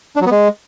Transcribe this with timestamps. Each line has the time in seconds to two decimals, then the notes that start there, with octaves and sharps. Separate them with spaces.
0.16 D4
0.21 F#3
0.26 B3
0.31 G#3